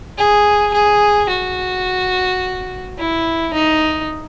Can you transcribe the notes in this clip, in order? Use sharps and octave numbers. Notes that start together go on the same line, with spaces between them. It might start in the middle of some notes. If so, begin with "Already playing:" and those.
G#4
G#4
F#4
E4
D#4